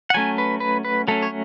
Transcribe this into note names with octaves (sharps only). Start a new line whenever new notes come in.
F#5
F#3 A3 C#4 G#5
B4
B4
B4
F#3 A3 C#4 A4
C#5